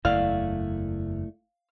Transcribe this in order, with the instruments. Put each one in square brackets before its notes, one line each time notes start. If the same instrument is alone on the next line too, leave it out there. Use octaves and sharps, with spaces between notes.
[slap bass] F#1 E2 [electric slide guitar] A3 E4 D5 [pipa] F5